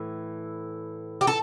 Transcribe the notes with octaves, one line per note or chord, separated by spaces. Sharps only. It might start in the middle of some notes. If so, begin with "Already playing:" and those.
Already playing: A2 E3
G4
A4